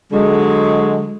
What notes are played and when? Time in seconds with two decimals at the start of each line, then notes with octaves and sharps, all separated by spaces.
0.12 D3 F#3 G#3